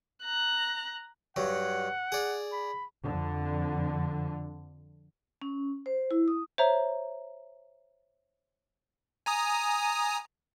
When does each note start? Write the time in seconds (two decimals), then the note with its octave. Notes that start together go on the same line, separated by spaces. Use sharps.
0.24 A#5 F#6
1.36 G2 F#3 F#5
2.12 G#4 D5
2.52 B5
3.03 F2 D3
5.42 C#4
5.86 C5
6.11 E4
6.28 D#6
6.58 C5 C#5 E5 A#5
9.26 G#5 A#5 D#6